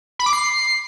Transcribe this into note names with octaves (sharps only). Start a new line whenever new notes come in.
B5
D6
C7